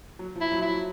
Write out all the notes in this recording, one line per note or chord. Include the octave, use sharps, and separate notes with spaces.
F#3
F3
E4
F#3
E4
F#3